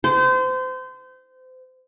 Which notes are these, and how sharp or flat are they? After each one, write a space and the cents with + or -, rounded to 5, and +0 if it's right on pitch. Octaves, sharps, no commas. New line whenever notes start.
C5 -30